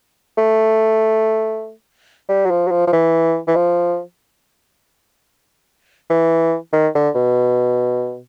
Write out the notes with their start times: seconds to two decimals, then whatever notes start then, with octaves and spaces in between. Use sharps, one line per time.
0.38 A3
2.29 G3
2.45 F#3
2.51 F3
2.68 F#3
2.71 F3
2.87 F3
2.93 E3
3.48 E3
3.55 F3
6.10 E3
6.73 D#3
6.95 D3
7.15 B2